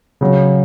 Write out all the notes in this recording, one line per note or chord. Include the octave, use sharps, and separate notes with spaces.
C#3 F#3